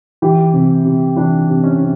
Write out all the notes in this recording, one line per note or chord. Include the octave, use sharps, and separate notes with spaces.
E3 G4
C3
C3
E3 D4
C3
C#4
C3